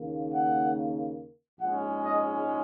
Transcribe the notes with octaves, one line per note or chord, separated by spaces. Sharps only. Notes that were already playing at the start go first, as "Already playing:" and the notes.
Already playing: D#2 C#3 A#3
F#5
A#1 G#2 G#3 C#4 F#5
D#5